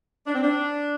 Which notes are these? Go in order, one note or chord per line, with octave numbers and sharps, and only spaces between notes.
D4
C4
D4